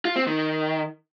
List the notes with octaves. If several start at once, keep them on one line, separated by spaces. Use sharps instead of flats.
F4
C4
D#3